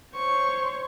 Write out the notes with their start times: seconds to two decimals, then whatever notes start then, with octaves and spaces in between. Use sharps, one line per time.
0.15 C5 C#5 C#6